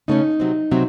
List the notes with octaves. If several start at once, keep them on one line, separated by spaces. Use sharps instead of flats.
C#3 A3 C#4 D#4
C3 F#3 C4
C3 F#3 C4